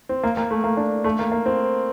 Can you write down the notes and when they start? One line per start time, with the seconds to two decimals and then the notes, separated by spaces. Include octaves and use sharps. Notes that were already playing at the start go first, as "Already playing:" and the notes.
0.09 C4
0.24 A#3
0.37 A#3
0.51 A3
0.64 A#3
0.77 D4
1.04 A3
1.19 A#3
1.32 A#3
1.46 C4